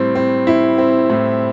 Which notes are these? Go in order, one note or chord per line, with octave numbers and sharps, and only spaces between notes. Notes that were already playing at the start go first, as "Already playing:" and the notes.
Already playing: A2 G3 C4
C4
E4
C4
A2